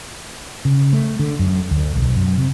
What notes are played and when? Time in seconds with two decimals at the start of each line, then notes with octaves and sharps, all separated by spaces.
0.65 C#3
0.93 A3
1.19 D3
1.39 F#2
1.71 D2
1.96 B1
2.16 F#2
2.38 C3